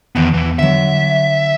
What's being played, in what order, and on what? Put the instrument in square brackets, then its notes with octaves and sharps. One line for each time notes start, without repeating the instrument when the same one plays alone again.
[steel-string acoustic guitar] E2 A5 [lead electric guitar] D#3 B3
[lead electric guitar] E3
[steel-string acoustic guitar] D3 F#3 [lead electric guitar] E5